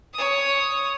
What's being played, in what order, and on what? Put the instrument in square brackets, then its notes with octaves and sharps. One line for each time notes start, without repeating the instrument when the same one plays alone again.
[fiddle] C#5 D#6